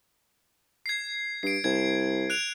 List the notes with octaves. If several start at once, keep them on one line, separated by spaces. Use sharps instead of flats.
G#6 C7
G2 C7 D7
C2 G#6
F#6 D7 F7